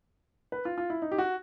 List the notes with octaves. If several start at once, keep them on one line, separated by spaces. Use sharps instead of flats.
B4
F4
F4
E4
D#4
G4
F#4